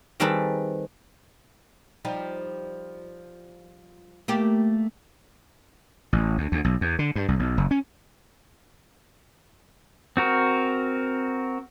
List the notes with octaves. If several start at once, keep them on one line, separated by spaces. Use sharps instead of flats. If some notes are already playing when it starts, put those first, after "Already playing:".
D#3 G3 C4 G#4 A4 B4
F3 G3 D#4
A3 A#3 G4
A1
D2
D2
B1
E2
D3
G2
C2
B1
F#1
C#4
C4 F#4 A#4